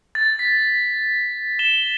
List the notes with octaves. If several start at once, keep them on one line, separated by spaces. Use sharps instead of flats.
A6
B6
E7 G7